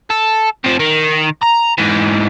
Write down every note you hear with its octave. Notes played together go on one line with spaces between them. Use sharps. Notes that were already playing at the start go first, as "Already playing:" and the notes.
A4
C3 F3
D#3
A#5
G#2 E3